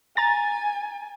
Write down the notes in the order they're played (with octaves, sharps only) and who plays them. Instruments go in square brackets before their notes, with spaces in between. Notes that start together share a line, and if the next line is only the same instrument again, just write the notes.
[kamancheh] G#5 [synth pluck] A#5 A6